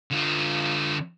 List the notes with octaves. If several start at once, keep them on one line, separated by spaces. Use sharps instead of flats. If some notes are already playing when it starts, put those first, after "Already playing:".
D3 F4